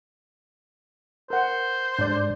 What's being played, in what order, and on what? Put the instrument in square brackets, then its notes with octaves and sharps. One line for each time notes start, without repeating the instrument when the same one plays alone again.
[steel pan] A#4 F#5 [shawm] C5
[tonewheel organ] G#2 [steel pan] D4 D5